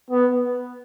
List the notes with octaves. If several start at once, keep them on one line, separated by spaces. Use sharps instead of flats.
B3